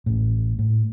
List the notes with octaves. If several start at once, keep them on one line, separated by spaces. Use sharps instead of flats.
A1 A2
A2